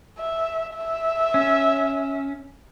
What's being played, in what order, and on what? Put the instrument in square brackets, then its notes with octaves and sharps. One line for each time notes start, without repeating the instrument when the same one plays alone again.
[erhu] E5
E5
[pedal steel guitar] C#4